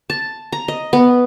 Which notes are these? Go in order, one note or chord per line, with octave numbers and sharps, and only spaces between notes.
A5
A#5
D#5
B3